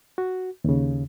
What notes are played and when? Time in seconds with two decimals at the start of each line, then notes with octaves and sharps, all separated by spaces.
0.18 F#4
0.64 D#2 C#3